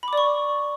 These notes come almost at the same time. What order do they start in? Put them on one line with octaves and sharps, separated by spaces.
B5 D6 D5 C#6